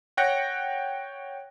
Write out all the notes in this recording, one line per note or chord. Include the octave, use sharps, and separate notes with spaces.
C#5 F#5 G5 F#6 A#6 C#7